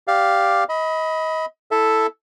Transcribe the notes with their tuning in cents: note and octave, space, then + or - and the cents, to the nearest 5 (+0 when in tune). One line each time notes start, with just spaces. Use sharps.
G4 +0 D5 +0 F5 +0
D#5 +30 B5 +0
E4 +0 A4 +0 E5 +0